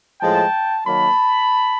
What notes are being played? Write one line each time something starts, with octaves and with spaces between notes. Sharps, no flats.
A2 F3 G#3 G5 A5
D#3 F#3 A#3 A5 B5